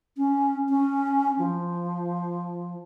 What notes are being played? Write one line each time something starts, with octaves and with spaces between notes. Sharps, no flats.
C#4
C#4
F3